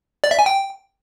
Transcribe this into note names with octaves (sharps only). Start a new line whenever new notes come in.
D5
E5
G#5
G5